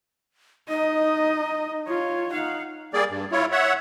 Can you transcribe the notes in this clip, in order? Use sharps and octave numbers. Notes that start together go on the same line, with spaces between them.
D#4 D#5
F4 C#5
D#4 F5 F#5
G3 A#3 G#4 D5
G2
E4 F4 C#5
C#5 E5 F#5